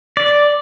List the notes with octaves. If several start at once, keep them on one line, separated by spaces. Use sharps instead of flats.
D5